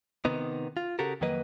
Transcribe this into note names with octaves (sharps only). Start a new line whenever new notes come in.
C3 D#3 B3 D#4
F4
C#3 F#4 G4 A4 A#4
F2 D#3 F#3 A#3 B4 D#5